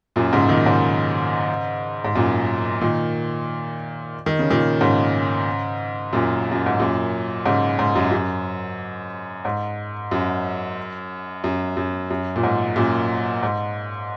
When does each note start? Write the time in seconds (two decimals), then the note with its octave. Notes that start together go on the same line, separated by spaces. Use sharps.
0.16 F#2 A#2
0.33 G#2 C#3
0.49 A#2 D#3
0.66 G#2 C#3
2.04 G#2
2.15 F#2 A#2
2.81 A#2 D#3
4.26 D#3
4.39 C#3
4.50 A#2 D#3
4.81 G#2 C#3
6.13 F#2 A#2
6.51 F#2
6.66 G#2
6.79 F#2 A#2
7.45 G#2 C#3
7.79 G#2
7.95 F#2
8.12 F#2
9.45 G#2
10.11 F#2
11.44 F#2
11.77 F#2
12.10 F#2
12.36 A#2
12.43 G#2
12.76 F#2 A#2
13.43 G#2